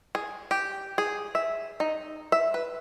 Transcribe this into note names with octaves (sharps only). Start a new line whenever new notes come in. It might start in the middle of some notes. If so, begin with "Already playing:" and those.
G#4
G4
G#4
E5
D#4
E5
B4